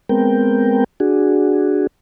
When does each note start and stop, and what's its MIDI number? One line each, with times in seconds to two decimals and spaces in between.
0.09 0.84 56
0.09 0.84 59
0.09 0.84 60
0.09 0.84 70
0.09 0.84 79
1.00 1.87 62
1.00 1.87 66
1.00 1.87 68